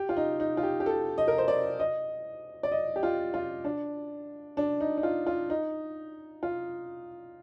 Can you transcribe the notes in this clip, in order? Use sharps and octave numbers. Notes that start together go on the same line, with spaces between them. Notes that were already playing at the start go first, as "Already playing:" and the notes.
Already playing: G4
F4
D#4
D#4
F4
G4
G4
A4
D#5
A#4
C5
D5
D#5
D5
D#5
G4
F4
F4
D4
D4
D#4
D#4
F4
F4
D#4
F4